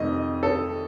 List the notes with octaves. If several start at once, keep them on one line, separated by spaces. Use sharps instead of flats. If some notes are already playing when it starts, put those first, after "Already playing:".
Already playing: F2 C3 D#3 A3 D#5
A4